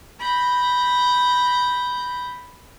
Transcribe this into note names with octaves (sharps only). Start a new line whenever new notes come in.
B5 G6 A#6